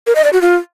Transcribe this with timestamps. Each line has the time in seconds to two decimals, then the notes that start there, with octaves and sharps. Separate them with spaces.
0.07 A#4
0.15 D#5
0.24 D5
0.33 F#4
0.42 F4